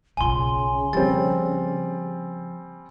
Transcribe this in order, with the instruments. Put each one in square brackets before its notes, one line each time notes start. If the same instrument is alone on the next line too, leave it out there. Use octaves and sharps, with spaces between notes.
[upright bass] B1 F4 [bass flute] C#3 [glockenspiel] G#5 C6
[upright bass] F3 A#3 [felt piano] G3 C4 [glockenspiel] A6